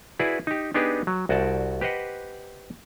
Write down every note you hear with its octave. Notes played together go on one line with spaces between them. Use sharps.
E4 F#4 G#4 B4 D5
D#4 G4
B3 D4 D#4 G4 G#4 B4
F#3
C2 F#4 D5 G5 A5
G4 B4 C5 D#5 F#5